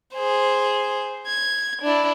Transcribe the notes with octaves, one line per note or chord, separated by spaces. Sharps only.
G#4 C5
G#6
D4 E4